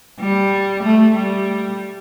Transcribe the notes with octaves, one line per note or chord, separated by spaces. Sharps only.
G3
A3
G3